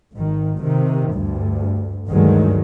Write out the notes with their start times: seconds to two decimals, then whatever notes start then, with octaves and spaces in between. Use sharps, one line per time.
0.12 G#1 D#3
0.61 C3 D#3
1.12 D2 G2
2.08 D2 G2 D#3 F#3 G#3